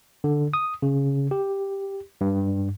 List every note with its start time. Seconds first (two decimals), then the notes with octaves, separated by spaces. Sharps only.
0.24 D3
0.54 D#6
0.82 C#3
1.31 G4
2.21 G2